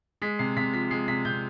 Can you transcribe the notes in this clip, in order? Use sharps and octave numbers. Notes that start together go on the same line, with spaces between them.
G#3 B6
C3 C7
C3 B6
F3 B6
G#3 C7
C3 B6
C3 G6